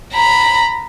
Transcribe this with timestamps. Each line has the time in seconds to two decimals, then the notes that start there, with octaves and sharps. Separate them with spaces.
0.13 A#5 B5